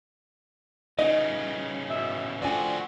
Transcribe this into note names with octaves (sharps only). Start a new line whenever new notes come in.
C#3 E3 D#4 D#5
B2 E5
F3 A3 C4 D4 F#4 D5 G#5